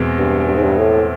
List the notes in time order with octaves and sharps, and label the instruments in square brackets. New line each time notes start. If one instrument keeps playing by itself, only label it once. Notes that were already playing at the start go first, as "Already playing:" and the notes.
Already playing: [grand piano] E2 B2 G#3 C4
[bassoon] G2
G2
G#2
G2
A2